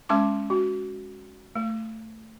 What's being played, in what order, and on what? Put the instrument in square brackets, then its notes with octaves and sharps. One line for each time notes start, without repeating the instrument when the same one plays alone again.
[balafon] G#3 C#4 C6 D6
F#4
A3